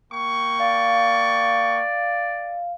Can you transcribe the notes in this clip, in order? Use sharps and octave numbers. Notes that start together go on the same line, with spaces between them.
A#3 G5 C#6
D5 F5